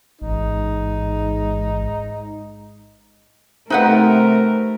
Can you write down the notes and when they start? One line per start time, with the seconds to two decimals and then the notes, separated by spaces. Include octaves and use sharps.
0.22 A1 G#2 D#4
3.70 C3 A3 D#4 A#4 B4 F#5